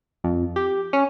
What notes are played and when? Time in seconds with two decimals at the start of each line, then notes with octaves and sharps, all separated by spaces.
0.24 F2
0.56 G4
0.93 C#4